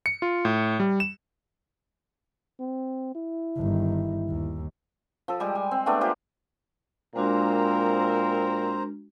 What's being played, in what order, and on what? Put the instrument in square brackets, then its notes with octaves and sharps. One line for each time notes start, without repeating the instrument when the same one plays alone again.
[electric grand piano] C#7
F4
A2
G3
E7
[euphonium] C4
E4
[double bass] G1 D#3
D#2
[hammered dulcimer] F3 A4
G3 G#3 G4
G#5
C4
G#3 A3 B3 D4
F4 G4 A#4 C5
[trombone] A#2 [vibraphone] G#3 D4 F#4 [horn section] C4 A#4 [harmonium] C5 A#5